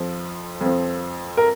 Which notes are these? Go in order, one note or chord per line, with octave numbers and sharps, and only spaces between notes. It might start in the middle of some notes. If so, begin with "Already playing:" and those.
Already playing: F2 F3
F2
F3
A#4